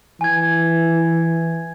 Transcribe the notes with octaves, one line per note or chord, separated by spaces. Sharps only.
E3 G#5 G#6